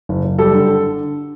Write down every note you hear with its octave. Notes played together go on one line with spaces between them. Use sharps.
F#1
F#1
G3 A4
D3
D3